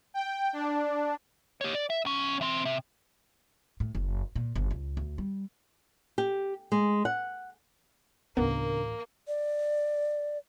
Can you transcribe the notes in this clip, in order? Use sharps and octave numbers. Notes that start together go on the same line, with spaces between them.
G5
D4
G4 C#5
D5
E5
B1 C#4
E3 C4
C3
A2
F#1
A#2
G1
C#2
D2
G3
G4
G#3
F#5
A1 D2 C#3 A#3 B3 D4 A#4
D5